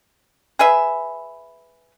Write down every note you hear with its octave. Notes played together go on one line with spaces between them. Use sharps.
G#4 B4 E5